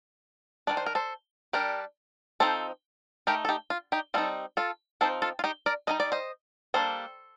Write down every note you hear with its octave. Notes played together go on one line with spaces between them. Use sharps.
D#3 A3 D4 D5
C5
A#4
A4 C5
G3 D4 G4 A#4
F3 C4 D#4 A4 C5
A3 D#4 G4 A#4
A4
D#4 G4
F4
D#4 G4
G3 C4 D#4 F4 A4
F4 A4
F3 C4 D#4 A4 C5
F4 A4
F4
D#4 G4
A#4 D5
G3 A#3 D#4 D#5
D5
C5 D#5
G3 A#3 D4 A4 C5